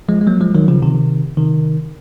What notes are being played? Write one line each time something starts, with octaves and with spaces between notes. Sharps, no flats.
F3 G#3
G#3
F#3 A#3
F3 G#3
D#3 F#3
C#3 F3
C3 D#3
C3 D#3